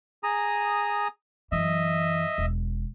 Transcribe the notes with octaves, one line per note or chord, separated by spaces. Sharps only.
G#4 A#5 D#6
F#2 E3 D#5 E5
E1